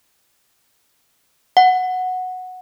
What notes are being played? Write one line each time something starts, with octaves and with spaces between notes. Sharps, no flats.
F#5